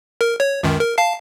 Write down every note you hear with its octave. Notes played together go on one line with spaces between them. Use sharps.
A#4
C#5
C#2 F#2 D#3
A#4
F5 A5 C7